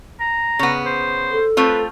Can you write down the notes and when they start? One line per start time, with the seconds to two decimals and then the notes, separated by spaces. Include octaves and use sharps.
0.20 A#5
0.59 C#3 B3
0.86 C5
1.32 A4
1.57 A3 C4 F4 B4